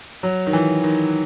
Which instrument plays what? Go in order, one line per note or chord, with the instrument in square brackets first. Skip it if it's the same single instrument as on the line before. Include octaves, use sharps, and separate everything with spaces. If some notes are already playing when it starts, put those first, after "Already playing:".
[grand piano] F#3
D#3
E3
D#3